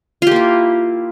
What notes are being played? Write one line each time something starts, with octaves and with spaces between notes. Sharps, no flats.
A#3 E4 F4 G4